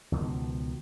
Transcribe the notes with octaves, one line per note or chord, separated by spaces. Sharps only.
C#2 B2 D#3 F3